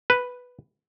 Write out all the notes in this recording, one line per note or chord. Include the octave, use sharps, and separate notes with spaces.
B4